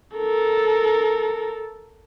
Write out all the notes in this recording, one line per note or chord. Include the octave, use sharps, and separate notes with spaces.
A4 A#4